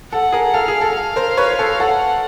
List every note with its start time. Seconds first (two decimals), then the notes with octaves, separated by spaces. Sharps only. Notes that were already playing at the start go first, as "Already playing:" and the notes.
0.12 A4 F#5
0.32 G#4 A#4
0.54 A4 F5
0.68 G#4
0.81 A4
0.96 F5
1.16 A#4 C5
1.37 B4 C#5
1.59 A4
1.79 A4 F#5